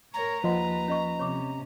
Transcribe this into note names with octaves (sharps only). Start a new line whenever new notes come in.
A#4 C#5 A#5
D#2 F3 B4 D#5 F#5 C6
C#4 D#5 C#6
C3 C#4 C#5 C#6 D6